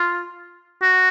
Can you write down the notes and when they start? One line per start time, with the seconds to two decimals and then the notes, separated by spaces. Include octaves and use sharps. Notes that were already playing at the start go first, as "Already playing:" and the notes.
Already playing: F4
0.82 F#4